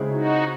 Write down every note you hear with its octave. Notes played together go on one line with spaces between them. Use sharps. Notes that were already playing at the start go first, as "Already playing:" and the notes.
Already playing: C#3 G#3 C4 E4 G#4
D#4 F#4